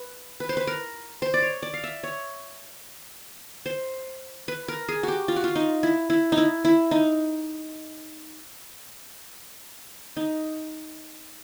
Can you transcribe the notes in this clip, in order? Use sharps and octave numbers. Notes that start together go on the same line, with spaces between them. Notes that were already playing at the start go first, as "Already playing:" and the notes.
Already playing: B4
B4
C5
B4
A#4
C5
D5
C#5
D5
F5
E5
C#5
C5
B4
A#4
G#4
F#4 G4
F4
F#4
F4
D#4
E4
E4
D#4
E4
E4
D#4
D#4